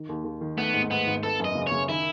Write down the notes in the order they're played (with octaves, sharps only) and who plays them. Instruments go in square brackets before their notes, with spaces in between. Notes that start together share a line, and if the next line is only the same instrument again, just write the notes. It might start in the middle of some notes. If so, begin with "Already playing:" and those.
Already playing: [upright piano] D#3
D#2
D#2
D#3
[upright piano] A3 [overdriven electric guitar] B3
[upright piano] G#2
[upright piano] G#2 [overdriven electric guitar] B3
[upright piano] G#1
[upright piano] B3 [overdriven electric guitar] A4
[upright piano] F#2 [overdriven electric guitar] D#5
[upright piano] C#3
[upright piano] C#3 [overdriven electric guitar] C#5
[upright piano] D#3 [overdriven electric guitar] E4